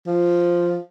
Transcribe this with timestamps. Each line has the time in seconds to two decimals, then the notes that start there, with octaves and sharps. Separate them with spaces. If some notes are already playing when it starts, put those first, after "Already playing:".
0.07 F3